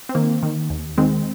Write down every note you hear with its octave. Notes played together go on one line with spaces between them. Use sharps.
C4
D#3 A#3
D#3
D#2
D#3 G#3 C4